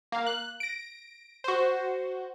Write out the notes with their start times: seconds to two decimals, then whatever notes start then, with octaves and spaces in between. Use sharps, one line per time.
0.12 A#3 F5
0.26 F#6
0.60 A#6 D7
1.44 F#4 C5